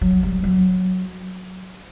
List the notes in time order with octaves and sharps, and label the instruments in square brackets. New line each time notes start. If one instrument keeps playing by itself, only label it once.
[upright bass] F#3
G3
F#3